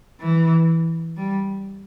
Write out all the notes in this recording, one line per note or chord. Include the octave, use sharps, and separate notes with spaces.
E3
G3